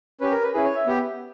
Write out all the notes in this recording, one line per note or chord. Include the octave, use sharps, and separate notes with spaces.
C#4 G4 B4
A#4
B4
C#4 E4 G#4 B4
C#5
E5
B3 G4